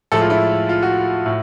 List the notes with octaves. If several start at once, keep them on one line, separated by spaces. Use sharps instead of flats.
A2 F3 G#3 A4
F4
E4
F4
F#4
A2